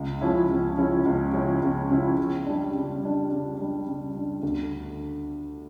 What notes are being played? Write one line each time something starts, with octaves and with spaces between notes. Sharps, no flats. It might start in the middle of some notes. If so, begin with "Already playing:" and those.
Already playing: C#2
C#3 F3 C#4 E4
C#2
C#3 F3 C#4 E4
C#2
C#3 F3 C#4 E4
C#2
C#3 F3 C#4 E4
C#3
G3 D4
C#3
G3 D4
C#3
G3 D4
C#3
G3 D4
D2